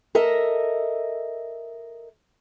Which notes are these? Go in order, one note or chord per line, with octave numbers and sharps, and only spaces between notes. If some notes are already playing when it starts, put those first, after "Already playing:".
A4 A#4 D#5 E5